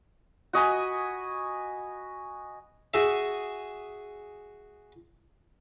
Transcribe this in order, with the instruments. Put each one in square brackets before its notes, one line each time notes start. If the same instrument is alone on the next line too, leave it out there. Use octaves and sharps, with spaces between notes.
[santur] F#4 D#5 G#5 B5
[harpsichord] F#4 G#4 E5